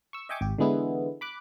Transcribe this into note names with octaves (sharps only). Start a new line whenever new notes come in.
C#6 E6
D#5 E5 G5 G#5 C#6 D6
G#1 G4
D3 E3 G#3 B3 E4
B5 D6 F#6